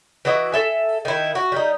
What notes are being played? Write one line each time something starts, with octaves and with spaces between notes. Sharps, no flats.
E3 E4 F#4 D#5
A4 E5 G#5
D#3 E4
F#4
G3 D#4